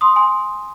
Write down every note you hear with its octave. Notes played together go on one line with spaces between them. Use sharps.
C6 D#6
G#5 C6